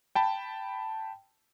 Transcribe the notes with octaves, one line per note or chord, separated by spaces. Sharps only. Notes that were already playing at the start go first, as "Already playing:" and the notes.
G5 A5 B5